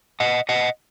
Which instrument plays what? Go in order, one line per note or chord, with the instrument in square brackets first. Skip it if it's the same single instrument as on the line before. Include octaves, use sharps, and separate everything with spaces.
[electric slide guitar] D#5 F#5
D#5 F#5